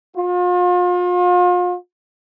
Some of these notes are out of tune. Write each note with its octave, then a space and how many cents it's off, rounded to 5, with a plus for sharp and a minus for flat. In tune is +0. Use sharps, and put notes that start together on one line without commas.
F4 +40